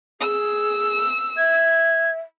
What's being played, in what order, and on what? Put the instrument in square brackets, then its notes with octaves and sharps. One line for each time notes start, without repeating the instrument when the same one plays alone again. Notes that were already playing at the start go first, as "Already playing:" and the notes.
[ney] G#4 [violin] E6
[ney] E5 [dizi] G#6